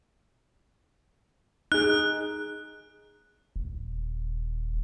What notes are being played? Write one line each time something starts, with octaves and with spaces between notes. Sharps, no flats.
D#4 G#4 F#6
D#1